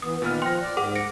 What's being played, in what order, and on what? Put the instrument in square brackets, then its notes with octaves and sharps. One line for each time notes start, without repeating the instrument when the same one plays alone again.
[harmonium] E3 B3 [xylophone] D#6
[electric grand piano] A#2 B3 F6 [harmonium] D#3
[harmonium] F3 [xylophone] G5 C6 [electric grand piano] F#6 A#6
[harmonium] D5
[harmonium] G#2 [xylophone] G#4 A#4 F#5 [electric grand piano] D6
[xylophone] A#6 C#7 D7